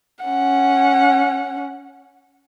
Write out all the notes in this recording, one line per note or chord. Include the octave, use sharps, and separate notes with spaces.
C#4 F#5